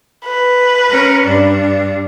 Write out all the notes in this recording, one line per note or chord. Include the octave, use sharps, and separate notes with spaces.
B4
C#4 A#4
G2 D4